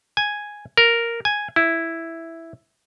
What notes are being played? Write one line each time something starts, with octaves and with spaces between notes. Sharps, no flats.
G#5
A#4
G#5
E4